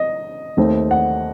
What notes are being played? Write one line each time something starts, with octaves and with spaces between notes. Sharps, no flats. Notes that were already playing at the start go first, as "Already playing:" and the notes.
Already playing: D#5
D#2 D#3 A3 C4
F#5